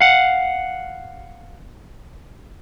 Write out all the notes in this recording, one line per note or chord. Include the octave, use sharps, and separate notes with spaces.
F5 F#5